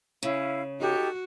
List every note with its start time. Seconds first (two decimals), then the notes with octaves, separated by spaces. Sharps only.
0.23 C#3 C#4 E4 F5
0.80 D#4 F#4 G4 A4